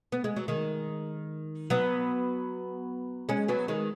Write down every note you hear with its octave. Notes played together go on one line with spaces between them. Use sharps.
B3
G#3
F#3
D#3 G#3
F#3 B3
G#3 C#4
F#3 B3
D#3 G#3